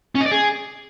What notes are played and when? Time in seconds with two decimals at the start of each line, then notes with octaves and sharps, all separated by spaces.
0.15 C#4
0.21 D#5
0.26 D5
0.31 G#4